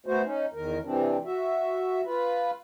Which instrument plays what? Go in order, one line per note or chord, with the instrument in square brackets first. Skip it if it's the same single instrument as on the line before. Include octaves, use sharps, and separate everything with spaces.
[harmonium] A3 B3 F#4 C5
C#4 D#4
E2 D#3 A#4
C3 E3 C4 D4
F#4 E5
F4 B4